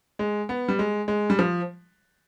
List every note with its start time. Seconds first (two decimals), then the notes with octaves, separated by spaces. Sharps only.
0.19 G#3
0.49 B3
0.69 G3
0.79 G#3
1.08 G#3
1.30 G3
1.39 F3